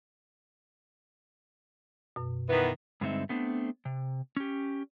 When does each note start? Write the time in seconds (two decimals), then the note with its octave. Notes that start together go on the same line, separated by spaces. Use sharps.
2.16 F#2 B2
2.49 D#3 E3 B3
3.01 G2 D3 G#3 C4 D#4 E5
3.29 A3 B3 C4 D4
3.85 C3
4.37 C#4 G4